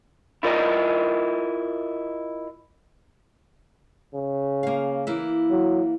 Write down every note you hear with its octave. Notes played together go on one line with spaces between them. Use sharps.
E4 F4 A#4 D5 D#5
C#3
A#3 F5
E3 A#3 E4
F#3